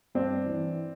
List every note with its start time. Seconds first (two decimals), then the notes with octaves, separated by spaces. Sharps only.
0.15 G2 C4 D4
0.46 E3